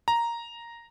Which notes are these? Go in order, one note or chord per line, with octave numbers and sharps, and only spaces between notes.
A#5